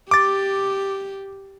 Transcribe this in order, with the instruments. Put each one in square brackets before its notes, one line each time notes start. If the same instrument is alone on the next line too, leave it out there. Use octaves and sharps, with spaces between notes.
[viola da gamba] G4 [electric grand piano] D6 A6